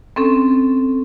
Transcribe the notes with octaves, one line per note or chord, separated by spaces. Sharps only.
C4 C#4 A4